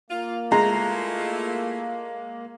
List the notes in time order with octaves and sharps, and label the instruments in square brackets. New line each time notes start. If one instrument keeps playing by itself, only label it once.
[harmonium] A#3 [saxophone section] F4
[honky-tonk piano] G#3 [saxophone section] A3 E4 F4 [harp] A#5